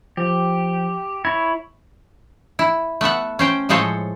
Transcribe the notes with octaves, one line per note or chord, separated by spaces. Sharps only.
F3 G4
E4 C#5 G#6
E4
A3 B3 E5 F#5
C#4 C5 G5
A2 F3 G#3 A4 C5 C#5